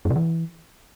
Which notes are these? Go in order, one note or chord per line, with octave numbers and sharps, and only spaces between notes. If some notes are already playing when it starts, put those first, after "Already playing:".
F#2
C3
E3